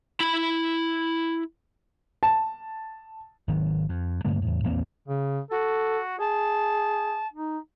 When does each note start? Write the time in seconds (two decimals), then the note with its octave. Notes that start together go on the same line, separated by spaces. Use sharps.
0.20 E4 B5
2.23 A5
3.48 G#1 D#3 F#3
3.89 F2
4.25 G2 D3 A3 A#3
4.42 E2 A2
4.64 A#1 E2 A#3 C4
5.08 C#3
5.51 F#4 A4
6.20 G#4 A5
7.34 D#4